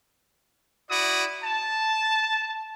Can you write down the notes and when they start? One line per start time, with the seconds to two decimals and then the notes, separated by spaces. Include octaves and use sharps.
0.90 E4 F#4 D5 D#6
1.44 A5